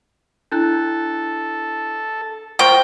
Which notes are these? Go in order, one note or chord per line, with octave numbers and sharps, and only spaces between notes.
D4 E4 A4 F#6
F4 C5 G5 A#5 C6 C#6